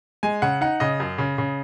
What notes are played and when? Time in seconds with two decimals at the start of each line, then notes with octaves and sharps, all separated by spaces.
0.23 G#3 G#5
0.42 C#3 F#5
0.61 D#4 F#5
0.80 C#3 D#5
1.00 F#2
1.18 C#3
1.38 C#3